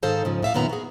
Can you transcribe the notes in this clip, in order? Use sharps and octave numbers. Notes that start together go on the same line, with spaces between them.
G#2 D#3 A4 C5 F5 A5
G#2 C#3 F3
A2 E5 F5
F#2 A#2 D#3 B3 A#5
F#4 G#4